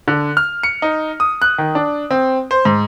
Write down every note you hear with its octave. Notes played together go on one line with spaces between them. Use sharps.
D3
F6
C#7
D#4
D#6
F#6
D#3
D4
C4
C5
G#2